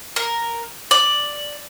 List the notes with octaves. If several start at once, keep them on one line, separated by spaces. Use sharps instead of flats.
A#4
D5